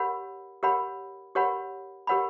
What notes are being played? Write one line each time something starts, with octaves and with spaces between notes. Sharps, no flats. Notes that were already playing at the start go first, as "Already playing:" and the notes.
Already playing: G4 A#4 C#5 F#5 B5
G4 A#4 C#5 F#5 B5
G4 A#4 C#5 F#5 B5
G4 A#4 C#5 F#5 B5